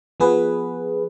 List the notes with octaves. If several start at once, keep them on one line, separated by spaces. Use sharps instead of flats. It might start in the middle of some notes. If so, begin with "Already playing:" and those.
F3 B3 G#4 B4